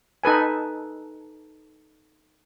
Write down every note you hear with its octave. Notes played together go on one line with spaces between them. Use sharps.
D#4 A4 B4 G#5